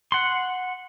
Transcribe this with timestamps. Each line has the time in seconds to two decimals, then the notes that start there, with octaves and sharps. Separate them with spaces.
0.12 F#5 C6